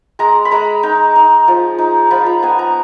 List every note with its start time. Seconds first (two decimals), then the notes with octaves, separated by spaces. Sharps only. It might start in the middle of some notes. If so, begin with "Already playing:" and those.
0.19 G#3 A#5
0.45 B5
0.51 G#3 A#5
0.83 D#4 A#5
1.16 D#4
1.48 F3
1.78 D#4
2.10 F3 B5
2.26 A#5
2.43 B3 G#5
2.59 A#5